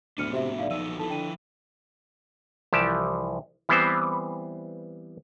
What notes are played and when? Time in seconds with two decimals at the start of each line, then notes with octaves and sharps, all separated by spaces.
0.18 D2 A2 B3 D4 F6 C#7 D#7
0.33 C3 F#4 E5
0.59 B1 D5 E5 F5
0.70 F3 D#4 F#4 E6 D#7
0.99 F3 E4 A4 A5
1.10 D3 G5 D#7
2.73 C2 E3 F3 G4 A5
3.69 E3 G3 B3 C4 C5